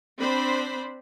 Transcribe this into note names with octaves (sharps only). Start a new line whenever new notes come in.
C4 D4 C5 B5